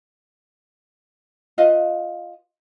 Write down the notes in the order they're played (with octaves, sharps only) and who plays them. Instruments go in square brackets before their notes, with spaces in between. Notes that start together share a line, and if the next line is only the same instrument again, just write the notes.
[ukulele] F4 B4 D#5 F5